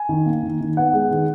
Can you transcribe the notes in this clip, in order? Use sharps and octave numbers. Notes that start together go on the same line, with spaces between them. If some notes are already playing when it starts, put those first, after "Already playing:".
Already playing: G#5
D#3
A#3
D#3
D#3
B3 F#5
G#3
D#3